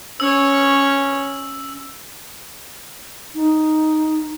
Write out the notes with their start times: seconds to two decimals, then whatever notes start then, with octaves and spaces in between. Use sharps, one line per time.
0.20 C#4 C#5 E6
3.35 D#4